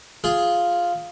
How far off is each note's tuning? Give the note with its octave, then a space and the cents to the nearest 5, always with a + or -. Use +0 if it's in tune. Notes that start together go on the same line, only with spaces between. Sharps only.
F4 +0 G#4 +0